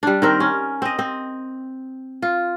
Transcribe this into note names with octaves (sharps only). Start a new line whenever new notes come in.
G3 D4
D#3 C4 A#4
C#4
C4 D#5
C4
F4